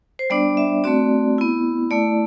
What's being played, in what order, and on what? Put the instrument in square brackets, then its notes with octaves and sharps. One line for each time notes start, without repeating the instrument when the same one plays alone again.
[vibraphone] C5
G3 B3 D4 D5
E5
A3 C4 F#4 D5
B3 E4
A3 E4 D5